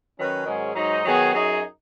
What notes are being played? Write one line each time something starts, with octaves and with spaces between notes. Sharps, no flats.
D#3 F#3 C#4 B4
G#2 D#3 F#3 C#4 G#4
G#2 F#3 D#4
D#3 F#3 B3 G#4
F#2 F#3 D#4 G#4